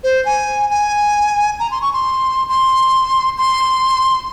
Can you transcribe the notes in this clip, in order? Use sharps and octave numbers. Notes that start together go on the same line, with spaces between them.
C5
G#5
G#5
A#5
C6
C#6
C6
C6
C6